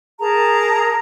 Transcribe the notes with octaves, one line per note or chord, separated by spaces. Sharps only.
G#4 A#4 A5 A#5